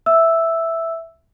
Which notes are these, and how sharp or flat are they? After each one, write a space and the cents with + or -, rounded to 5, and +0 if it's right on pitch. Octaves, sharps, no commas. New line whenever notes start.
E5 +0 E6 +0